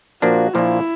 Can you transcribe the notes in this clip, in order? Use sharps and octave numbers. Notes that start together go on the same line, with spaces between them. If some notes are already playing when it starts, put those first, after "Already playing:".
A#2 F3 A#3 D4 F#4
A#2 F3 A#3 D4 E4